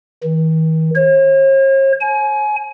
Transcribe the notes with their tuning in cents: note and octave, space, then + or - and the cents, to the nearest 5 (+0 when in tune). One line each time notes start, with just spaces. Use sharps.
D#3 +45
C#5 -45
G#5 +30